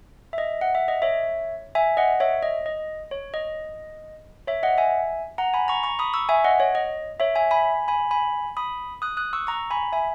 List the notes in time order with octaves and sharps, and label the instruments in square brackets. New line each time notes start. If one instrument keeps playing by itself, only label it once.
[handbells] E5
D#5
F#5
E5
D#5
C#5 E5
E5 G#5
D#5 F#5
C#5 E5
D#5
D#5
C#5
D#5
C#5 E5
D#5 F#5
E5 G#5
F#5 A#5
G#5 B5
A#5 C#6
A#5 C#6
B5 D#6
C#6 E6
E5 G#5
D#5 F#5
C#5
D#5
C#5 E5
E5 G#5
G#5 B5
G#5 B5
G#5 B5
B5 D#6
D#6 F#6
D#6 F#6
C#6 E6
A#5 C#6
G#5 B5
E5 G#5